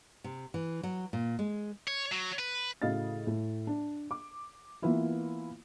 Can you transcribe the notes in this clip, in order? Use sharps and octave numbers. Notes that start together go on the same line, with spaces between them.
C3
E3
F#3
A#2
G#3
C#5
F#3
B4
A2 C#3 F#4 D#5 F5 A6
A2
D4
D6
E3 A#3 B3 E4 F4